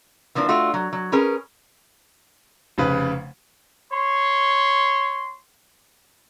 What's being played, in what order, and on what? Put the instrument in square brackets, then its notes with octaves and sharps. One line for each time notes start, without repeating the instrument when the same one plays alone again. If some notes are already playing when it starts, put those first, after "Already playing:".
[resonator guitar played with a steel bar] E3 F3 A#3 D4
A3 D4 F4 F#4
F#3
F#3
C#4 G#4 A#4 B4
[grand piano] F1 C#3 B4
[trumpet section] C#5 C6